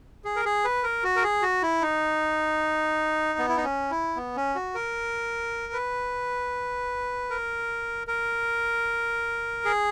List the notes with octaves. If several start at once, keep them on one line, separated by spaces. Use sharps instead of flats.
G#4
A#4
G#4
B4
A#4
F#4
A#4
G#4
F#4
E4
D#4
B3
E4
D#4
C#4
E4
B3
C#4
F#4
A#4
B4
A#4
A#4
G#4